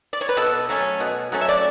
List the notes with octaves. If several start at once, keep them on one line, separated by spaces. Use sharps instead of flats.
D5
C#5
B4
B2 A4
F#3 A3 C#4
B2
F#3 A3 C#4
E5
D5